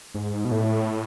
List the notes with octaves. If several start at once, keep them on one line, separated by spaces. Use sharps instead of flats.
G#2
B2
A2